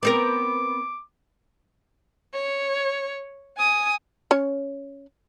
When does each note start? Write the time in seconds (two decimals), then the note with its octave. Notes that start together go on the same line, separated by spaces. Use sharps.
0.03 B3 C4 A#4 D6
2.34 C#5
3.57 G#5 D#6
4.31 C#4 C#5